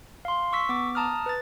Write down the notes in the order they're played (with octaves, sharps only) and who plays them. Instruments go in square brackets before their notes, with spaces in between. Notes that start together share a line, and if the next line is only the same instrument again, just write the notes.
[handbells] F5 C6
C#6 E6 B6
B3 D6
A5 A#5 D#6 F6
B4 A6